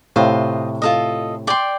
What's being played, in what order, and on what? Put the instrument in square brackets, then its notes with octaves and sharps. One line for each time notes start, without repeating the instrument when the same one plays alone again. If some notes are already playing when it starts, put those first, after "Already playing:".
[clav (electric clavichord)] A2 C3 [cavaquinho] F4 C5 D#5
[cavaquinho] F4 A4 D#5
D5 G5 C6